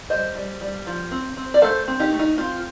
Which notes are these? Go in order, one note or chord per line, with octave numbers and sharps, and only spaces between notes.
G3 C5 D#5
G3
G3
F3
C4
C4
D5
A3 A4 C5
C4
D#4 G4
A3
D#4
C4 F4